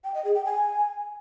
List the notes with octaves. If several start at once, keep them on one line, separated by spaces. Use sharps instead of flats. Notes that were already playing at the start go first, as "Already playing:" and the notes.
G5
D#5
G#4
G5
G#5